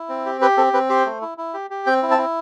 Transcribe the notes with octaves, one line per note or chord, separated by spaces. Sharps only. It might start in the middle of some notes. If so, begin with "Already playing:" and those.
Already playing: E4
C4
G4
G4 B4
C4 A4
C4 B4
G4 C5
A3
E4
E4
G4
G4
C4 G5
E4
A5
E4